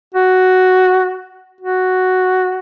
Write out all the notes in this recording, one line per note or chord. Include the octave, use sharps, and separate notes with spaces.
F#4
F#4